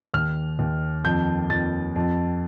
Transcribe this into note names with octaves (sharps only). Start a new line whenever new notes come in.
D#2 F6
D#2
F2 G6
F2 A6
F2